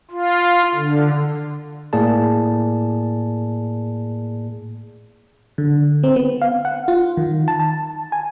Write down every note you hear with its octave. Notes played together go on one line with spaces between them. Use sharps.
F4
D3
A2 A#3 G#4 D5 A5
D3
C4
B3
F5
F#5
F4
D#3
A5
A5
G#5